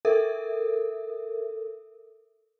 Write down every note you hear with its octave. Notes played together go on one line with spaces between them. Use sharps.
A4 A#4 E5